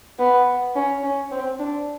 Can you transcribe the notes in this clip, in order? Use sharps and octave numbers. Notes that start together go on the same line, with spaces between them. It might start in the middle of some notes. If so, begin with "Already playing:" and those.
B3
C#4
C#4
C4
D4